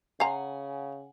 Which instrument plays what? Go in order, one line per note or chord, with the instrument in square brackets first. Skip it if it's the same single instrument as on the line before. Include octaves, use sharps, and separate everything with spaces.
[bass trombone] C#3 [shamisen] F5 A#5 [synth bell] F#5 G#5